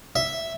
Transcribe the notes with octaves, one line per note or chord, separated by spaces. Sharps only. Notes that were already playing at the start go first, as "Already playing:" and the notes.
E5